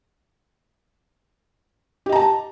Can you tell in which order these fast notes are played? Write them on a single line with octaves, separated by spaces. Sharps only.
G4 D#5 A#5 A5